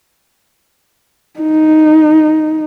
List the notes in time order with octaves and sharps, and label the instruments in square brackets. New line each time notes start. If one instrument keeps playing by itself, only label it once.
[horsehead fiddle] D#4